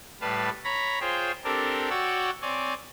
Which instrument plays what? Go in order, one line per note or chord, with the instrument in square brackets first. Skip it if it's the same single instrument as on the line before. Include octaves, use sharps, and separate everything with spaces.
[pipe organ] A2 G3 B4 F5 A5
C#5 A#5 B5
F4 G#4 C5 C#5 G5
C4 D4 G4 A4 A#4
F#4 C#5 D5 F#5 G5 E6
C4 C#5 D5 G#5